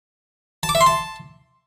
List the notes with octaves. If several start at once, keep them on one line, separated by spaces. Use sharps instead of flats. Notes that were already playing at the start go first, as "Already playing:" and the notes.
A5
D6
E5
C6
A5